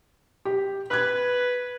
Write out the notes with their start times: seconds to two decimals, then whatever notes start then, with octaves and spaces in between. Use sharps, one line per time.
0.45 G4
0.91 B4 F#6 G#6